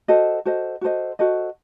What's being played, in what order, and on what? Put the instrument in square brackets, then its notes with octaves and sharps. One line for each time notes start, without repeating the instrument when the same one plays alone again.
[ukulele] F#4 A4 C5 D#5
F#4 A4 C5 D#5
F#4 A4 C5 D#5
F#4 A4 C5 D#5